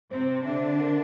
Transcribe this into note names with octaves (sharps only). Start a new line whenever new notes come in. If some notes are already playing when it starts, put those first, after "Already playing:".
C3 C4 C5
C5
D3 D4 E5
E5
A#4